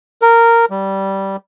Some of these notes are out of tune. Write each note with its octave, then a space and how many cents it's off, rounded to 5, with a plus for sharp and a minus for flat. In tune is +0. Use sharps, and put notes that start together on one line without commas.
A#4 -10
G3 -15